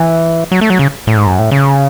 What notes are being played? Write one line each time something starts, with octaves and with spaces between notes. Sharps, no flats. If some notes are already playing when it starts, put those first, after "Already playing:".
Already playing: E3
F#3
A3
F#3
C#3
A2
G#2
F#2
A2
C#3